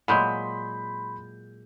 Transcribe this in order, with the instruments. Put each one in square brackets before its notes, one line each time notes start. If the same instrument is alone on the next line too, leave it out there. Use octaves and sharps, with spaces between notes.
[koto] A#2 F#3 G#3 [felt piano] B5 C6 G6